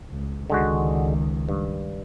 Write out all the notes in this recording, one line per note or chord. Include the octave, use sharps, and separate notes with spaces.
C#2
C#2 D3 D#3 G#3 F#4
G2